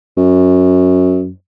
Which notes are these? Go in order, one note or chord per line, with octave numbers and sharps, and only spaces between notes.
F#2